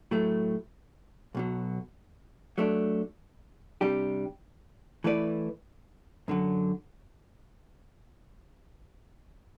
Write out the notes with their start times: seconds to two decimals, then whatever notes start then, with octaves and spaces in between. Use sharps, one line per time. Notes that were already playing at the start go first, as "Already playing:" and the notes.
0.11 A2 F#3 A3
1.35 B1 B2 F#3
2.58 F#3 A3 D4
3.81 C3 G3 D4 G4
5.04 E3 A3 E4 B4 D5
6.28 F#2 D3 F#3